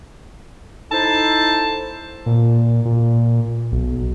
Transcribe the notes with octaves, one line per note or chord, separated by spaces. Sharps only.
D#4 E4 A4 C5 A5
A#2
A#2
B1